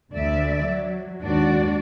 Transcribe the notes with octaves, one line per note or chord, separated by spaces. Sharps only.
D2 D5 E5
F#3
D#2 G#2 D4 F#4 D5